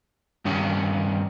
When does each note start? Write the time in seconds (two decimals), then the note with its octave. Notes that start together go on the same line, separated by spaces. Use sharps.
0.45 G2 D#3 C#4